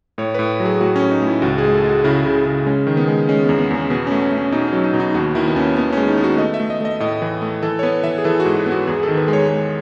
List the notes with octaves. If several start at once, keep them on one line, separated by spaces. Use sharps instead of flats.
A2 C#5
A2 B4
F#3
G#4
A2 F#4
C#4
A2
D#4
A2
E4
C#2 F#4
G#3 G#4
A4
G#3
F#4
C#3 E4
C#3
C#3
G#3 C#4
D#3
B3
G#3
G#3 C#4
E2 B3
B3
E2 C#4
B2 B3
A3 C#4
C#4
A3
C#4
B2 D#4
F#3 C#4
D#4
B2
D#4
D#2 F#4
D#3 E4
B3
D#2 C#4
B3
G#3 C#4
D#4
B3
F#4
A3 D#5
E5
A3
D#5
A3 D#5
A2 D#5
E3
A3
E3 A4
C#5
B3 B4
E3 E5
G#4
E3 A4
F#4
G#2
F#4
B3
F#4
E2 G#4
A4
D#3
B4
G#3
C#5
G#3